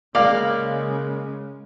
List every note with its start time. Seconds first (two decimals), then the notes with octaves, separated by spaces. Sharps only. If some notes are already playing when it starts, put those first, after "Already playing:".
0.15 C#3 G#3 A#3 D5 F5